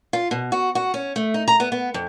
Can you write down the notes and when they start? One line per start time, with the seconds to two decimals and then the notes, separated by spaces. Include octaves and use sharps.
0.13 F4
0.31 B2
0.52 F#4
0.75 F#4
0.94 C#4
1.16 A3
1.34 D#4
1.48 A#5
1.60 B3
1.72 B3
1.94 F2